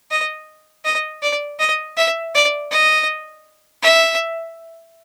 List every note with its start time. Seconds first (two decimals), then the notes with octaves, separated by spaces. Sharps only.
0.11 D#5
0.85 D#5
1.23 D5
1.59 D#5
1.97 E5
2.35 D5
2.71 D#5
3.83 E5